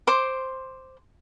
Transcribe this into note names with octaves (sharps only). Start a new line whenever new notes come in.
C5 C6 D6